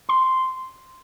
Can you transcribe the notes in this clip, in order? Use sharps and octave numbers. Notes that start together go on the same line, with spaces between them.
C6